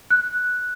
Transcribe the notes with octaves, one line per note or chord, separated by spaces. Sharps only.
F#6